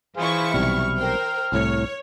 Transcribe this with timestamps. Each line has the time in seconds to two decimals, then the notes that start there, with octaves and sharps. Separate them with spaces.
0.17 E3 E4 G#4 C5 F5 C#6
0.54 B1 C3 G3 F6
0.97 A#4 C5 G5
1.52 C2 A2 C#5